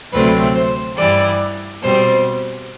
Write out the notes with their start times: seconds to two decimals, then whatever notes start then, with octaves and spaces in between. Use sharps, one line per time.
0.12 D2 C3 F#3 A3 C4 B4
0.55 C5
0.97 G2 E3 G3 D5
1.82 B2 G3 C4 C5